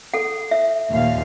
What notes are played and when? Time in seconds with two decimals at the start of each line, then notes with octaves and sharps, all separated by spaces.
0.14 A4 F#5
0.51 E5
0.90 D#2 A#2 F5